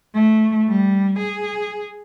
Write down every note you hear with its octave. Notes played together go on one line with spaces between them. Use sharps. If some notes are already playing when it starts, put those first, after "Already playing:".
A3
G3
G#4